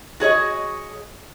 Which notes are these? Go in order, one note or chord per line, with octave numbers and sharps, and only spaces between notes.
F#4 G#4 C#5 D#5